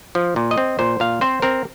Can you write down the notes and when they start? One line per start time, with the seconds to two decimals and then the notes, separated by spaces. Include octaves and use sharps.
0.15 F3
0.36 A#2
0.51 D#5
0.58 C4
0.79 A#2 C5
1.00 A#2 F5
1.21 C4 C5
1.42 C4 A#4